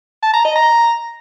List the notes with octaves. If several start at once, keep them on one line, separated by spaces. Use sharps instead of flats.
A5
A#5
D#5
A#5